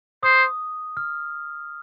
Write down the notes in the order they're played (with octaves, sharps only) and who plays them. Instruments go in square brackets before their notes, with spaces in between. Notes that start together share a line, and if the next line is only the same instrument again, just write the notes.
[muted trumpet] C5 [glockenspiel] D#6
[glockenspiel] F6